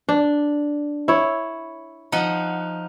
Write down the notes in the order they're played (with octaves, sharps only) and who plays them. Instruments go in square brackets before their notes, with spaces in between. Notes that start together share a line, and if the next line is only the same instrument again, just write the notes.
[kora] D4
E4 C#5
[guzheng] F3 D#4 F#5